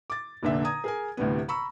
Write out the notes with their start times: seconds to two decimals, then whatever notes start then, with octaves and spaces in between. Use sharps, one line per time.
0.10 D6 A6
0.43 F1 A#2 D3 E5
0.64 A#5 D#6 G#6
0.84 G#4 A#4 G#5
1.17 D2 A2 C3 G3 B3
1.48 A#5 B5 C#6 E6